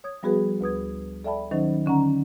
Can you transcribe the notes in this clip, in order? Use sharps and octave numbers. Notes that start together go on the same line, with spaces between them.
C#5 D#6 G#6
F3 G3 B3 F#4 G#4 B4
D2 B4 D#6 G#6
A4 D5 E5 G5 A5 B5
D#3 F#3 C#4 D#4 C5
D3 C#4 F#5 A#5